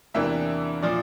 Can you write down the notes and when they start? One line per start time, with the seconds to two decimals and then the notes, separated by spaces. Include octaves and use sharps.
0.14 E2 C3 E3 A#3 D4 E5
0.82 A#2 F3 D5